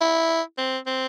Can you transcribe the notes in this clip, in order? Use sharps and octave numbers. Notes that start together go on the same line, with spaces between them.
E4
C4
C4